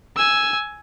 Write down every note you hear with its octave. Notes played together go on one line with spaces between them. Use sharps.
G#5 E6